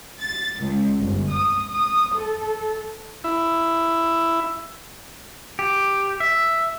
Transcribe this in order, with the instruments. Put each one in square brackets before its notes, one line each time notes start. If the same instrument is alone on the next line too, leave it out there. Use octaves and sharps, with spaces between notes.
[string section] A6
C#2
G1
D#6
D#6
A4
[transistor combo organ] E4
[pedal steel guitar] G4
E5